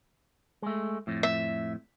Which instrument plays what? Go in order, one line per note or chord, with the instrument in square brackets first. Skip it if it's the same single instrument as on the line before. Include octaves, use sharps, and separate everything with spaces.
[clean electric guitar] G#3 A3
F2 A2
[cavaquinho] E5